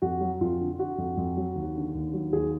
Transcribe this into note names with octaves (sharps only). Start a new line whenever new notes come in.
F2 F#4
F#3
F2 F4
D3
D3 F#4
F2
F2
F#3
D#2
D3
D#2
F#3
D#2 G#4